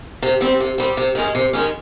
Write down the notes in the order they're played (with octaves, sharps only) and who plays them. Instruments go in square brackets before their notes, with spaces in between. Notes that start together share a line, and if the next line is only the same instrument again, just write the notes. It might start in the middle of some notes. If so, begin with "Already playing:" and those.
[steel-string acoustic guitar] C3
G3 C4
C3
G3 C4
C3
D#3 G#3 C#4 G#4
C3
D#3 G#3 C#4 G#4